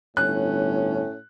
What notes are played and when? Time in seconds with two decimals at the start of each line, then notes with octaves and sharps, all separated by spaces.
0.17 G1 A2 C#4 F#6